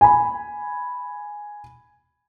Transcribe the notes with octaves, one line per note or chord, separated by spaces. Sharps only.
G#5 B5